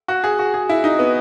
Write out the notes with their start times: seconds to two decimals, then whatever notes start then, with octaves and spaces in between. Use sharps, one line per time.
0.08 F#4
0.24 G#4
0.39 F#4
0.54 G#4
0.69 E4
0.84 D#4
0.99 B3